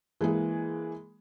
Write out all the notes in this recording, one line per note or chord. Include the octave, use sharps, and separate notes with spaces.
E3 G#3 A#3 G#4